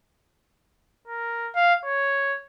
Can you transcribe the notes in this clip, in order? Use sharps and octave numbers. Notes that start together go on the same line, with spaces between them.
A#4
F5
C#5